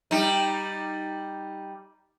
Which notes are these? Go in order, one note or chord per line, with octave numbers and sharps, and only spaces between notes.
G3 D#4